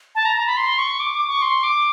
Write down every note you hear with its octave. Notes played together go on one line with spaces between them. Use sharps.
A5
A#5
A#5
B5
C6
C#6
D6
D6
C#6
C6
D6